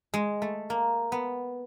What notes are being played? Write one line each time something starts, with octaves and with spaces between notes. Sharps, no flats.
G#3
A3
A#3
B3